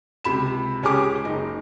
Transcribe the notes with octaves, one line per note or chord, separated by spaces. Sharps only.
C#2 C3 B5 E7
C#2 C#4 G4 G#4 D6
F#1 D#4